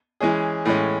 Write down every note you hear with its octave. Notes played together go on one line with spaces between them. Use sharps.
E3 G#3 C#4 G#4
A2 E3 G#3 C#4